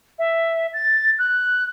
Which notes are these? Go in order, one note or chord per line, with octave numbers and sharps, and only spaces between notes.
E5
A6
F#6